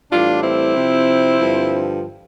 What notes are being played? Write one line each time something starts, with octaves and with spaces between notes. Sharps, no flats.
A2 E3 G3 D4 F4
C4 E4
C3 F3
G2 D3 F3